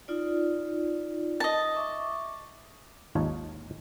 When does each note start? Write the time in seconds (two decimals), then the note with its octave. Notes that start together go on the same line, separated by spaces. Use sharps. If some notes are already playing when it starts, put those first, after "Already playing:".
0.08 D#4 F4 D5
1.40 D#5 A5
1.75 E5 C#6 D6
3.15 G#1 D#2 D#4 F4 C#5 A5